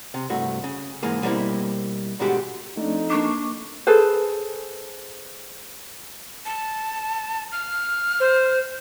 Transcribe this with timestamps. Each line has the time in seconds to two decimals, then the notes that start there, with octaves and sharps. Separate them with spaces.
0.14 C3
0.30 C2 G2 A3 F#4
0.64 C#3
1.03 G#2 E3 G#3 A#3
1.22 B2 G3 A#3 C4 E4
2.19 G#2 B2 D3 G#3 F#4 G4
2.77 F2 A3 D4 D#4
3.10 A#3 D4 C#6 D6
3.87 G#4 A4 B4 C5
6.46 A5
7.52 F6
8.20 C5